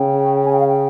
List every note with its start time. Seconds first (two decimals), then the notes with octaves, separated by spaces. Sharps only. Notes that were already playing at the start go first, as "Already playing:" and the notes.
Already playing: C#3 G5
0.45 G#5
0.53 G5
0.60 F5
0.68 G5